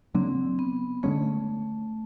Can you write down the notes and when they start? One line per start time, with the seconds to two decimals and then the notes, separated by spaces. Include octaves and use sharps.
0.15 C#3 F#3 A#3 C4 D4
0.59 B3
1.03 D3 F3 G#3 A3 C#4